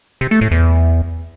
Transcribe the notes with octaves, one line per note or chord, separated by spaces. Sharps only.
C3
A3
A2
E2